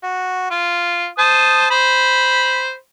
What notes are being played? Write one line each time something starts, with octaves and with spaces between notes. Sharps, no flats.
F#4
F4
C5 A5 D#6
C5 B5